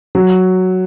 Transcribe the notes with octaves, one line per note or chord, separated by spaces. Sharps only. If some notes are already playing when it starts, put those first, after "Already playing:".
F#3